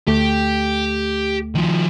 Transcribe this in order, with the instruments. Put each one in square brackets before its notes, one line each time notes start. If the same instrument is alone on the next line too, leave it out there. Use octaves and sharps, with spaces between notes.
[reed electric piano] D2 A3 [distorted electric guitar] G4
[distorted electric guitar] D#3 F3